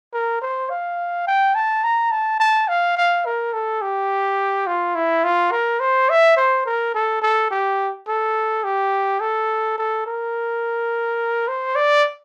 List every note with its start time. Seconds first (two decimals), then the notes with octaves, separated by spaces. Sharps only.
0.13 A#4
0.42 C5
0.70 F5
1.27 G5
1.55 A5
1.84 A#5
2.11 A5
2.40 A5
2.68 F5
2.97 F5
3.26 A#4
3.54 A4
3.82 G4
4.67 F4
4.95 E4
5.24 F4
5.52 A#4
5.80 C5
6.09 E5
6.37 C5
6.66 A#4
6.95 A4
7.22 A4
7.51 G4
8.08 A4
8.64 G4
9.21 A4
9.78 A4
10.06 A#4
11.48 C5
11.76 D5